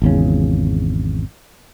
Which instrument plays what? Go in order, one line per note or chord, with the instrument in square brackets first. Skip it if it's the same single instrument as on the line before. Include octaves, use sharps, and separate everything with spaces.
[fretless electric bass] G#1 E2 C#3